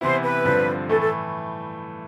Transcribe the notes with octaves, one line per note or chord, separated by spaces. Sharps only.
C3 E3 B3 E4 C5
B4
G2 D3 F3 C4
A2 E3 A3 A4
A4